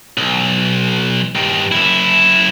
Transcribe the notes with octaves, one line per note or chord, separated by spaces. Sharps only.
B1
G2 D#3
F#2 E4